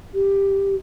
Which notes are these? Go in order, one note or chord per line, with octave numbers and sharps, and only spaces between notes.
G4